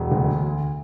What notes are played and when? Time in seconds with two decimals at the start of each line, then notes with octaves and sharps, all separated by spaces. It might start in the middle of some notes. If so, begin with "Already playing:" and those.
Already playing: E1
0.12 D2